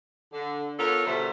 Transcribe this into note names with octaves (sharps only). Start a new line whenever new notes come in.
D3
B3 F4 A4 A#4 C#5
B2 D3 G3 A3 C5 E5